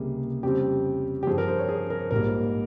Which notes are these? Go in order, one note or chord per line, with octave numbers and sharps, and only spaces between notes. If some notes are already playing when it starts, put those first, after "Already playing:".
Already playing: C#2 C3 G3 A#3 G#4
F2 C#3 G3 C4 G4
G4
G2 F3 C4 G#4
A#4
C5
C#5
G#4
A#4
A#1 G#2 G3 A#3 A#4